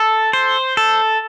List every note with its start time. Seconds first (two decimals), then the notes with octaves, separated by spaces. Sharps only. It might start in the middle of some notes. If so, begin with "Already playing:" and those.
Already playing: A4
0.33 C5
0.77 A4